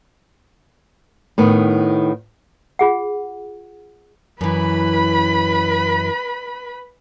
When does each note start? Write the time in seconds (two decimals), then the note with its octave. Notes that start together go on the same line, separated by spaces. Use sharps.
1.38 A2 D#3 B3
2.79 F4 G#4 F#5
4.41 F#2 E3 B4 B5